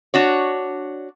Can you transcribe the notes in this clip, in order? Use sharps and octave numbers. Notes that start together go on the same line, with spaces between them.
D4 F#4 C#5